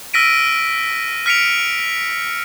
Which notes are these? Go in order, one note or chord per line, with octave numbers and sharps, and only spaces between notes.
E6 F6 A#6 B6 D7 D#7
F6 B6 C#7 D7 F7